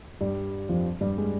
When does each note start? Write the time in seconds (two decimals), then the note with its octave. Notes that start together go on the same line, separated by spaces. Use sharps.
0.21 G2 G3
0.69 F2 F3
1.01 G2 G3
1.18 G#3